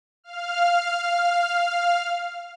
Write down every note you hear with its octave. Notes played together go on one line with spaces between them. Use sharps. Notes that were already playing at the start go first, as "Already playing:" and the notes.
F5 F6